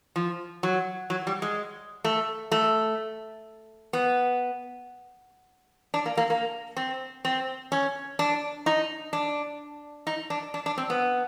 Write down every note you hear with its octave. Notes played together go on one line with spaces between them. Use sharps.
F3
F#3
F#3
G3
G#3
A3
A3
B3
D4
A#3
A#3
A#3
C4
C4
C#4
D4
D#4
D4
D#4
D4
D4
D4
C4
B3